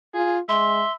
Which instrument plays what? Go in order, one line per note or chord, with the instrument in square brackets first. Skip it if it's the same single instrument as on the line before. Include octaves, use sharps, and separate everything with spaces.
[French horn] F4 [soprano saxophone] G#4
[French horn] G#3 [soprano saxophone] E5 [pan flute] C6